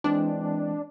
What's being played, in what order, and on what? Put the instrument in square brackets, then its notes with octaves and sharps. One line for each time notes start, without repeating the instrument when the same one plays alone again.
[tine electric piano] E3 G#3 C4 [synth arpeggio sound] D4